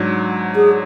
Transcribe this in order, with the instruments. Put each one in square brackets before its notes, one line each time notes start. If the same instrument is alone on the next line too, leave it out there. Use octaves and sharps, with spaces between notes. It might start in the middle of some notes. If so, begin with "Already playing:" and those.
Already playing: [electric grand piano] G#2 F#3 D4
[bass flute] G#4